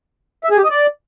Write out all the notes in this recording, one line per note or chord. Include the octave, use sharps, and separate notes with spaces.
E5
G#4
G4
D#5
D5